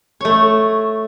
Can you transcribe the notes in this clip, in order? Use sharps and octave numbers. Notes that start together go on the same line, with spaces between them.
A3 C#5